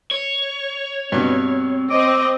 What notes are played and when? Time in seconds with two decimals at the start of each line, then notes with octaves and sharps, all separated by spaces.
0.11 C#5
1.12 G2 B2 C4
1.90 C4 D#5 D6